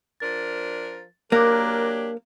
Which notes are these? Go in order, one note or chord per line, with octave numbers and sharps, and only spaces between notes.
F3 D4 A#4 A6
F#3 A#3 D4 G4 A#4 D6 F#6 A#6